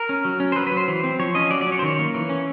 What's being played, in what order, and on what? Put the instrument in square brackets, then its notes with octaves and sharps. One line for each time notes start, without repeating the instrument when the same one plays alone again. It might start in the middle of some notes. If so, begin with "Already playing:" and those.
Already playing: [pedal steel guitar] A#4
C#4
F#3
C#4
C5
F#3 B4
B4
F#3
C5
E3
C4
F3 C#5
C#4 D#5
F#3 D5
D5
C#4
C#5
C5
D#3 C#5
A#3
E3
C#4